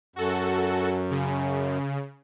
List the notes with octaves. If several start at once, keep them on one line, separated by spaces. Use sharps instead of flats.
F#2 F#4 A4
C#3